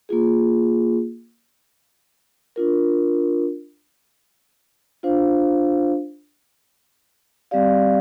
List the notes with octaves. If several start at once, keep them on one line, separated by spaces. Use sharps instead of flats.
A#3 F4 G#4
D4 F4 A#4
D4 F4 C5 F5
G3 C4 G4 D5 F5